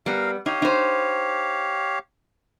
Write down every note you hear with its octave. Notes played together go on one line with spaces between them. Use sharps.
G3 B3 A#4 F5
D#4 G4 C#5 F5
D#4 C5